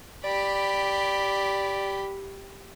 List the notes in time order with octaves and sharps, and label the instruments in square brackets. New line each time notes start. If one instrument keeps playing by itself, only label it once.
[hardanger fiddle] G4 B5 [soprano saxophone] D5